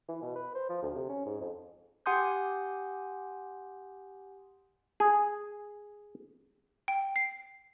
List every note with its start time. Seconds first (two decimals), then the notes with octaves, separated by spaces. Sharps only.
0.09 E3
0.22 B2
0.35 B4
0.55 C5
0.69 F3
0.82 D2
0.95 C3
1.09 C#4
1.26 G#2
1.41 F2
2.06 G4 F#5 G#5 C6 D#6 G6
5.00 G#4
6.88 G5
7.16 C7